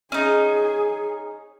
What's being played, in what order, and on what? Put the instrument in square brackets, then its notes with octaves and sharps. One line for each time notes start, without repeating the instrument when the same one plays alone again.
[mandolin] C#4 D#4 [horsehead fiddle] G#4